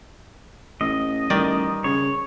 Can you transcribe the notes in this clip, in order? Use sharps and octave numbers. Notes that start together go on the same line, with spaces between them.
A1 D#5
A1 D#3 G3 D5
C#3 C#5